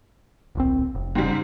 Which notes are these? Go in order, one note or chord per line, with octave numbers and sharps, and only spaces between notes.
D1 A#1 C4
F1
G#2 C#3 G3